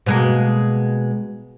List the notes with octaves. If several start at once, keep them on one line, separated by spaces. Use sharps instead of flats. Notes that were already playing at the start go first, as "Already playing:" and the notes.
B2 G#3 A#3